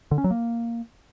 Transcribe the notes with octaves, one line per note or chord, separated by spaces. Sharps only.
D3
C#4
F#3
A#3